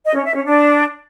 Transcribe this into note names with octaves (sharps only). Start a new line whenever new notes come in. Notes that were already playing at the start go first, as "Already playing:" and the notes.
D#5
C#4
E5
C#4
D4